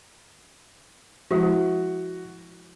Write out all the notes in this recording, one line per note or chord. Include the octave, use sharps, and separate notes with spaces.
F3 G#3 E4 F#4